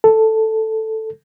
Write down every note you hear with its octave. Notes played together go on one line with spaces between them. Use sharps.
A4